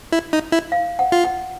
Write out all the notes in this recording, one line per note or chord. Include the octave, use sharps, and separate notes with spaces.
E4
D#4
E4
F5
F#5
F4
F#5